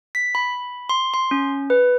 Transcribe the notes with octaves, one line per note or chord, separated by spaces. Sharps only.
B6
B5
C6
C6
C#4
B4